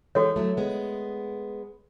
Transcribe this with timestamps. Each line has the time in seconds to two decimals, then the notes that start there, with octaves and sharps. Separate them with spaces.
0.15 E3 G#3 F#4 A4 C#5
0.36 F#3 A3
0.57 G#3 B3